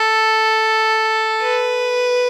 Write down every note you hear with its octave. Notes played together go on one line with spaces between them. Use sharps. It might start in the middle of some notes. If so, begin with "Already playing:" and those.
Already playing: A4
B4